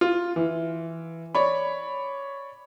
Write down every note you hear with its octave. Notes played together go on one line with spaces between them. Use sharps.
F4
E3
C#5 D5 B5